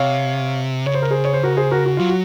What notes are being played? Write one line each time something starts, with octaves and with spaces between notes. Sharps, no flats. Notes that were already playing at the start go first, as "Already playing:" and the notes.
Already playing: C3 C#5 F5
C#3 C#5
C5
A#4
G#4 C5
C#5
C5
F#4 A#4
G#4 C5
F#4 A#4
F#4
F#3 F4
F#4